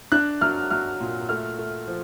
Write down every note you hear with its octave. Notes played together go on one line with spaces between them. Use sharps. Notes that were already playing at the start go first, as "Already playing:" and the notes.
D4 F#6
F#3 F6
F#3 F6
A#2
A3 F6
A3
F3